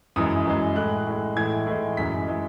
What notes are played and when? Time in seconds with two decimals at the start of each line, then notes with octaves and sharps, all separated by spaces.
0.16 F#2 E3 G#3 D#6
0.46 F#2 E3 G#3
0.76 A2 G#3 F#6
1.07 A2 G#3
1.36 A2 E3 G#3 G#6
1.67 A2 E3 G#3
1.97 F#2 E3 G#3 B6
2.28 E3 G#3